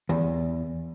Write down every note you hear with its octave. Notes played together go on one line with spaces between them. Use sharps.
E2